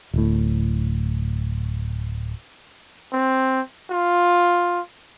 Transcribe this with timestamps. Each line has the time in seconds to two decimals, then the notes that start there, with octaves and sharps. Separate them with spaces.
0.14 D1 A2
3.13 C4
3.90 F4